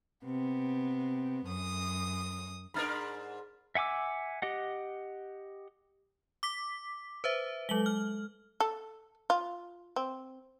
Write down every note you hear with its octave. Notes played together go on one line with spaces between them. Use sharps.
C3 B3
F#2 D#6
G#2 D4 A#4 B5 F6 A6
E5 F#5 G#5 D6 E6
G4 D#5 F#5
D6 B6
B4 C5 E5
F#3 G#3 A4 F#7 G7
F6
A4
F4
C4